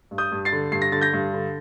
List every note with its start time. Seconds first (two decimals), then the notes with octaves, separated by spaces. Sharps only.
0.11 G2
0.18 D#6 G6
0.32 G2
0.45 A6 C7
0.52 D3
0.72 G2 C7
0.82 A#6
0.92 D3 A6
1.01 G6 A#6
1.13 G2
1.34 D3